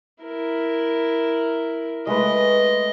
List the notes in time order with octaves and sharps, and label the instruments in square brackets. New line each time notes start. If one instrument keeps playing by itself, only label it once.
[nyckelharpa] E4 A#4
[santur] G#3 A3 B4 [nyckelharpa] D#5